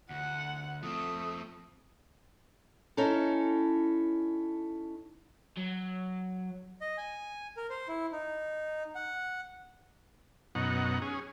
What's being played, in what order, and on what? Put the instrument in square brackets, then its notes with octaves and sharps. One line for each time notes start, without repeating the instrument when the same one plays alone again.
[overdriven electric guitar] D2 [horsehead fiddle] F#5
[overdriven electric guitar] F3 C4 [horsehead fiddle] A3 [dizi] D#6
[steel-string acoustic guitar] C#4 D#4 E4 A4
[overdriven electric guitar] F#3
[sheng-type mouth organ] D#5
G#5
A#4
C5
E4
D#4
F#5
[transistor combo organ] F#2 B2 D#4 F#5
C#4 G#4